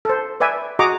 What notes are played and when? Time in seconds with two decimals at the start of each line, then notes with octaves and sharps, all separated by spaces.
0.05 A4 C5
0.40 B4 D5 E5 G#5
0.79 F#4 G#4 D#5 A#5 C#6 D6